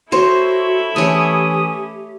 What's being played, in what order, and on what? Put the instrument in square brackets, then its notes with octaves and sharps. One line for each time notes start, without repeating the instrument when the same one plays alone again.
[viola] E4 A4 [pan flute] F#4 [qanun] C5 C#5
[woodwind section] E3 C#4 D#6 [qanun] A3 C#5 [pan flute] G4